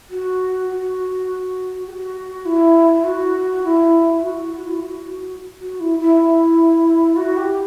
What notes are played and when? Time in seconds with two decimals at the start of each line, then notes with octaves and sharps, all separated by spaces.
0.09 F#4
0.68 F#4
1.87 G4
1.90 F#4
2.45 E4
3.04 F#4
3.63 E4
4.22 F#4
4.36 F#4
4.52 F#4
4.66 E4
4.80 F#4
5.59 F#4
5.80 E4
5.99 E4
7.16 F#4
7.36 G4